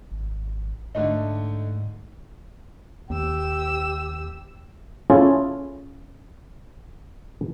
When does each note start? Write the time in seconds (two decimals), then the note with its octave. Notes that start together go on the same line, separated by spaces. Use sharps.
0.11 G#1
0.95 G#2 D3 A3 D#4
3.10 D#2 G4 E6
5.10 C#4 E4 F4 G#4 A4